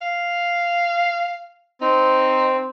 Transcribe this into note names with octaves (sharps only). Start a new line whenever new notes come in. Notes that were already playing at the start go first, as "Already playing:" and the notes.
F5
C4 D#4